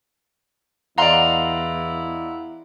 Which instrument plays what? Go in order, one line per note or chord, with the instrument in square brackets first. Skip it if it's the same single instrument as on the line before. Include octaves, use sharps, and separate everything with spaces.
[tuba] E2 [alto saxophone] E4 [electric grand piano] D5 D#5 F#5 [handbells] F5 A#5 C6